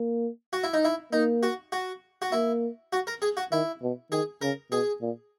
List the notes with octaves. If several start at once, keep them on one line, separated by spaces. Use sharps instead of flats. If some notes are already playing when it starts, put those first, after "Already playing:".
Already playing: A#3
F#4
E4
D#4
E4
A#3 D#4
F#4
F#4
F#4
A#3 E4
F#4
A#4
G#4
F#4
D#3 E4
B2
D#3 G#4
C#3 A#4
B2 G#4
A#2